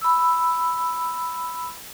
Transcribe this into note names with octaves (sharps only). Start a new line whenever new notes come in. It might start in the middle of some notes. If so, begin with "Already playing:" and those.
B5 E6